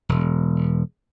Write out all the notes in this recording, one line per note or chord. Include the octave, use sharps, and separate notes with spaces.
E1